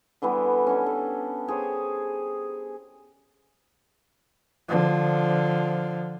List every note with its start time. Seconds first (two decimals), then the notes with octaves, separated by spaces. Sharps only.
0.22 D3 E3 G3 B3
0.67 C#4 D4 G4
0.86 A4
1.47 G4 G#4 C5 C#5
4.69 D3 F3